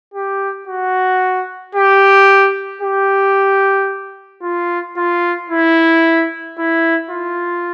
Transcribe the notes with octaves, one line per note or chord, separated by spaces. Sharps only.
G4
F#4
G4
G4
F4
F4
E4
E4
F4